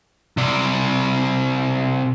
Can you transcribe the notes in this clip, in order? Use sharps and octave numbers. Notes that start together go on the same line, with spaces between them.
C3 D5